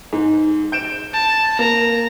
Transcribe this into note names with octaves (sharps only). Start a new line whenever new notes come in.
G#2
G6 D7 E7
A5
A#3 A#5